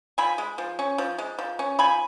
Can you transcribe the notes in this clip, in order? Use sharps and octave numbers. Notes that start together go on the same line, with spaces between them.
F3 G#5 B5
G#3
F3
C#4
F3
G#3
F3
C#4
F3 G#5 B5